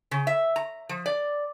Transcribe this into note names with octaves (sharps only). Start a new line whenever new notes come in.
C#3
E5
A#5
F3
D5